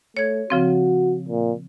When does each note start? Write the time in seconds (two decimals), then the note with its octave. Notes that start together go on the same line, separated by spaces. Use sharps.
0.17 A3 C#5 G#6
0.50 C#3 F3 C4 F#4
1.29 A#2